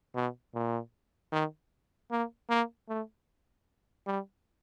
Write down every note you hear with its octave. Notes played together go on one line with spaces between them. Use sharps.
B2
A#2
D#3
A#3
A#3
A3
G3